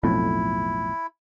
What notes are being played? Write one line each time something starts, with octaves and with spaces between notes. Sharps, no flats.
B1 F2 A2 E4